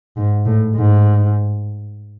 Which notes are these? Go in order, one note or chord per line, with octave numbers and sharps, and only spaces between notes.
G#2
A2
G#2